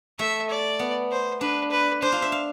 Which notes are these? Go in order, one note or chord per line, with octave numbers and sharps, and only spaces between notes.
A3 E5
D5
B3
C5
D4 B4
B4
D4 C5
F4
E5
F5